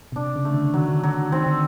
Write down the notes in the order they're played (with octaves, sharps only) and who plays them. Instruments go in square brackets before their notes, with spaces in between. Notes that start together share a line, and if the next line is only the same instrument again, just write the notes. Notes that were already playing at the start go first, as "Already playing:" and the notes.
[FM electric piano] B2
[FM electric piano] C3 [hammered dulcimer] D4
[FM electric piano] C#3
[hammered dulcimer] A3
[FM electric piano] D3
[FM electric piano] D#3 [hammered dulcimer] F#3
[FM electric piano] D3
[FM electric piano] D3 [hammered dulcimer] F#3
[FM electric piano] D#3 [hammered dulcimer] C4
[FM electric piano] D3